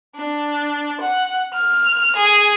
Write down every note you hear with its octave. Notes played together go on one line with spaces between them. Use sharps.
D4
F#5
F6
G#4